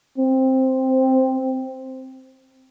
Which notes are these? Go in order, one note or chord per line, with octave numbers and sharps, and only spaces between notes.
C4